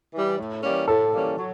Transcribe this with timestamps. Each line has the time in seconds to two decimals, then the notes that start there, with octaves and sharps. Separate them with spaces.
0.14 E3 G3
0.38 A2
0.63 E3 G3 A#3 C#4
0.88 A2 A4
1.13 E3 G3 A#3 C#4
1.37 F#3